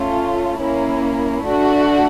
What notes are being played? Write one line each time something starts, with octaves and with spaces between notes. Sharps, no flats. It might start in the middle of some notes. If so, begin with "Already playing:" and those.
Already playing: A3 C#4 F4
A#3 C#4 E4
A3 D4 F#4